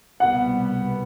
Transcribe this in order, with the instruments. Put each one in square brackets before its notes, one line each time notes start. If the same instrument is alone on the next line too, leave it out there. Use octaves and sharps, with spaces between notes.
[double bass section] C2 B2 G3 B3 [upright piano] F#5